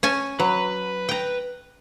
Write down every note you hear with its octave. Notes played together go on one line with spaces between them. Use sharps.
C#4 G#5 A5
F#3 B4
G5 A#5